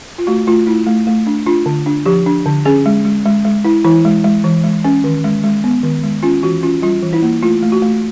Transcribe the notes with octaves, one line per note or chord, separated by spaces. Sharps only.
F4
A3 F#4
A3 F4
A3 E4
A3
A3
D4
D4 F4
D3
D4
F3 G4
D4
D3
C#4 G#4
G#3
G#3
G#3
G#3
E4
E3 E4
G#3
G#3
E3
G#3
C#4
D#3
G#3
G#3
B3
D#3
G#3
C#4 F4
E3 F#4
C#4 F4
G3 F4
E3
E4
A#3
A3 F4
A3
F#4
A3